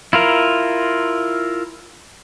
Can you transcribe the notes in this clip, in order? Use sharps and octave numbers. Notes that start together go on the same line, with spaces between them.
E4 F4 A#4